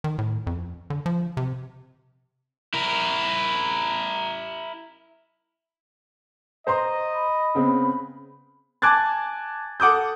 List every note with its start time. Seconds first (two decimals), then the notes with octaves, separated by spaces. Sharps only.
0.04 D#3
0.18 A2
0.47 F2
0.90 D3
1.06 F3
1.37 C3
2.74 E4 A#4
6.67 C5 D#5 A#5 C6
7.15 B5
7.55 C#3 B3 C4
8.82 G#5 A5 D6 F#6 G#6 A6
9.80 A4 F#5 D6 D#6 G6